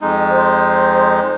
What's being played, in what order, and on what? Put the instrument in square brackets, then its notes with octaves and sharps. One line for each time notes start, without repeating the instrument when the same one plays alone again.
[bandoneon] F2 G#3 D#4
[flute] C5